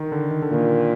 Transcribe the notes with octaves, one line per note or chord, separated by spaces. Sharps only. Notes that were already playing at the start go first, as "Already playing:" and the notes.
Already playing: D#3
D3
D#3
D3
A#2 D#3